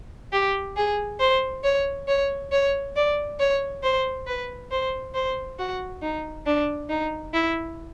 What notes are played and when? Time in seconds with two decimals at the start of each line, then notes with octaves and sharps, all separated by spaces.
0.33 G4
0.77 G#4
1.20 C5
1.64 C#5
2.08 C#5
2.52 C#5
2.96 D5
3.40 C#5
3.83 C5
4.27 B4
4.71 C5
5.15 C5
5.59 F#4
6.02 D#4
6.46 D4
6.89 D#4
7.33 E4